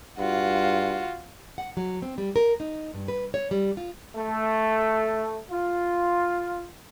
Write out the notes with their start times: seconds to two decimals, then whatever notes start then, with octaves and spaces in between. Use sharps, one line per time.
0.19 G2 F4 F#4
1.58 F#5
1.77 F#3
2.02 C4
2.18 G3
2.36 A#4
2.60 D#4
2.94 G2
3.08 B4
3.34 C#5
3.51 G3
3.77 F4
4.16 A3
5.51 F4